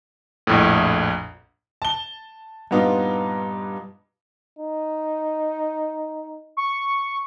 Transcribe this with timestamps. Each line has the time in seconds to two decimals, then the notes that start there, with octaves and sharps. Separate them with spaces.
0.47 A#1 F2 A2
1.82 A5 G7
2.71 G2 A#2 B3 D#4 F4
4.59 D#4
6.57 C#6